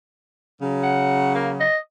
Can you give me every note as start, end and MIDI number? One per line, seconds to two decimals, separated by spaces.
0.62 1.65 49
0.62 1.65 54
0.83 1.30 78
1.35 1.50 58
1.60 1.77 75